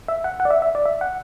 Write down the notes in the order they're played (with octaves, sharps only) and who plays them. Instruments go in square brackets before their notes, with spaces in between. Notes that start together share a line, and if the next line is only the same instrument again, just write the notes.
[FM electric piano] E5
F#5
F#5
D5
E5
E5
D5
E5
F#5